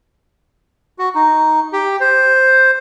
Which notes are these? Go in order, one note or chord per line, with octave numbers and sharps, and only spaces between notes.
F#4
D#4
G4
C5